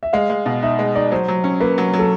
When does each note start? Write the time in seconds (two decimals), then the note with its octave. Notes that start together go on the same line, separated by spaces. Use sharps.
0.03 E5
0.13 G#3 F5
0.30 G#3
0.46 B2
0.62 D#4 E5
0.79 G#3
0.95 D#4 D5
1.12 F#3 C5
1.28 F#3
1.44 C#4
1.60 A#3 B4
1.78 F#3
1.93 F#3
1.99 A4